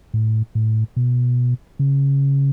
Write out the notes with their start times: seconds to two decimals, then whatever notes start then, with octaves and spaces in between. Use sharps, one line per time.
0.14 A2
0.55 A2
0.96 B2
1.79 C#3